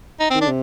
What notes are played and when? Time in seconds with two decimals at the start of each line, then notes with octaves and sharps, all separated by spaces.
0.20 D#4
0.30 C4
0.34 D#3
0.41 D4
0.48 C3